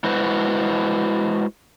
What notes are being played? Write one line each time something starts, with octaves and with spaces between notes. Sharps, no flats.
G#3 E4 F#4 B4 C5